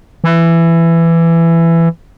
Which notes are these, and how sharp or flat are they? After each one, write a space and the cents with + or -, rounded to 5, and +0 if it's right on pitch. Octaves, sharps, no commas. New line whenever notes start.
E3 +15